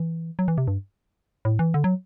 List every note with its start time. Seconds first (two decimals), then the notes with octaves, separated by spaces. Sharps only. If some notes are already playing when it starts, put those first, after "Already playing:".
Already playing: E3
0.39 F#3
0.48 E3
0.58 C3
0.68 G2
1.45 A2
1.59 E3
1.74 D3
1.84 F#3